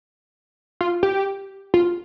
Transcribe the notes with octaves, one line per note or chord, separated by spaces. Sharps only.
F4
G4
F4